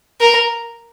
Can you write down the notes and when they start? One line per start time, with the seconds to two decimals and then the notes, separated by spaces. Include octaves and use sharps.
0.21 A#4